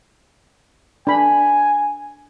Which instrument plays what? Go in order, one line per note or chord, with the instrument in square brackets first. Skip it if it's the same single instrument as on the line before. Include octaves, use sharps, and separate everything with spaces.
[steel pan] D4 B5 [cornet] G#5